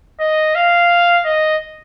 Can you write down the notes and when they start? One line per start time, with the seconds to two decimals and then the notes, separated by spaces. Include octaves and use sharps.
0.20 D#5
0.55 F5
1.25 D#5